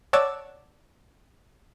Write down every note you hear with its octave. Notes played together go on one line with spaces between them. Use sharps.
C#5 D5 F#5 A5 D6 E6